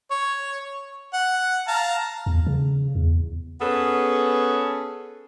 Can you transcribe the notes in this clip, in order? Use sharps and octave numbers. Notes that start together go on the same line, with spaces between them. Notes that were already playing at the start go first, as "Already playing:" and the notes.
C#5
F#5
F5 A5 A#5
E2
C#3
E2
B3 C#4 G#4 A4 B4